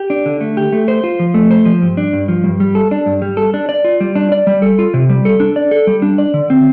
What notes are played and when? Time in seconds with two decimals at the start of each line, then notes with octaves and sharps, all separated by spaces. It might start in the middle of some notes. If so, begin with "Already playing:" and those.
Already playing: G4
0.10 D4
0.26 D3
0.41 A3
0.57 G4
0.73 A3
0.88 C5
1.04 F4
1.20 F3
1.34 A3
1.51 C5
1.65 F3
1.82 G2
1.97 D4
2.13 G2
2.28 F3
2.44 G2
2.60 G3
2.75 A4
2.91 D4
3.06 G2
3.22 G3
3.37 A4
3.54 D4
3.69 D5
3.84 F4
4.00 G3
4.15 D4
4.32 D5
4.47 G3
4.62 A4
4.79 F4
4.94 C3
5.09 G3
5.25 A4
5.40 D4
5.56 D5
5.71 A4
5.87 G3
6.02 D4
6.18 D5
6.34 D3
6.50 C4